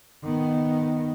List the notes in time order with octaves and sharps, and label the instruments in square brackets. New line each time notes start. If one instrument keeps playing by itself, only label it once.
[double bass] D#3 B3